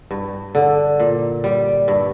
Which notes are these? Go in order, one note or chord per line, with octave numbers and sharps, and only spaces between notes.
G2
D3
A#2
G3
G2